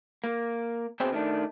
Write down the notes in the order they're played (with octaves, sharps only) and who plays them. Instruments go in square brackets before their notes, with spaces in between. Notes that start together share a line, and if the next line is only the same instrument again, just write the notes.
[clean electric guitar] A#3
B2 C4 G#4 C5 G5
D#3 A3 D4